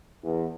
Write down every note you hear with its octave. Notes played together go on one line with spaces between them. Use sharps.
E2